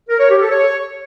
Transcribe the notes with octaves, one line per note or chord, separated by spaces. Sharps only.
A#4
C#5
G4
A4
C#5